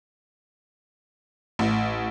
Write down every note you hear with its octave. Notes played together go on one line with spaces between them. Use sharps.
A1